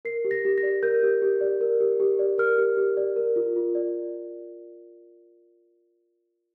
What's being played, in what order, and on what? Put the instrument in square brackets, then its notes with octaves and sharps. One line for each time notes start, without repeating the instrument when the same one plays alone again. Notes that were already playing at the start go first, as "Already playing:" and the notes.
[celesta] A#4 C7
G4
A#6
G4
A#6
D5
A#4 G6
G4
G4
D5
A#4
G4
G4
D5
A#4 F6
G4
G4
D5
A#4
F4
F4
D5